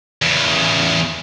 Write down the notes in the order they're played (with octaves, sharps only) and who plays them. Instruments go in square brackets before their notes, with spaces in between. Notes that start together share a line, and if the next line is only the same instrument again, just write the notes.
[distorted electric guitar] E2 C#3